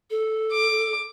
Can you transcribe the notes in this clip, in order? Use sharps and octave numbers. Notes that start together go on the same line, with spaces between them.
A4
D6